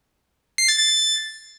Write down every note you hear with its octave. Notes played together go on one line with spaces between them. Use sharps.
C7
A6
A6
A6